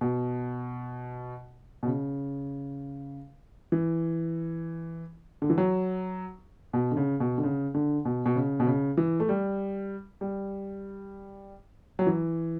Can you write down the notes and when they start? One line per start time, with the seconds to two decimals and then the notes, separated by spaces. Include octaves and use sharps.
0.01 B2
1.83 B2
1.86 C#3
3.72 E3
5.42 D3
5.50 E3
5.58 F#3
6.73 B2
6.91 D3
6.97 C#3
7.20 B2
7.38 D3
7.43 C#3
7.74 D3
8.05 B2
8.26 B2
8.36 C#3
8.60 B2
8.67 C#3
8.97 E3
9.20 A3
9.29 G3
10.21 G3
11.99 F#3
12.07 E3